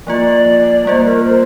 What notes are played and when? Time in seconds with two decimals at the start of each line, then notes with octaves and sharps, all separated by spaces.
0.07 F3 A#3 F4 D5
0.85 G3 A#3 F4 C5
1.05 A#4
1.24 C5